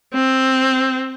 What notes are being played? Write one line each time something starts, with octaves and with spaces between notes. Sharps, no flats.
C4